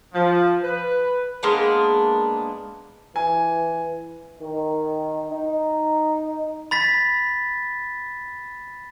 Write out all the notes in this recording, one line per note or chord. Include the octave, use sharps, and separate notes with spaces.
F3
B4
G#3 A#3 B3 D4
E3 G#5
D#3
D#4
B5 A6 B6